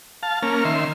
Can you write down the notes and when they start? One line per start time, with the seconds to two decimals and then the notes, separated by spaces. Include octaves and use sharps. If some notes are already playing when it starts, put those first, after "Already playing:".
0.23 F5 A5
0.42 A#3 C#4 F6
0.65 D#3 E5 C6